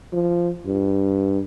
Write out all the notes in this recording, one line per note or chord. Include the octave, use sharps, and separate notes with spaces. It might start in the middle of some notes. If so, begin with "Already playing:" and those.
F3
G2